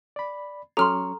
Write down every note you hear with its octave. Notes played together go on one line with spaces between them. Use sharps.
D5 B5
F#3 C#4 A4 A#5 C6 C#6 F6